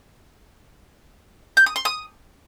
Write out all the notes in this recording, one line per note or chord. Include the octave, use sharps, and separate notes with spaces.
G6
D#6
C6
D#6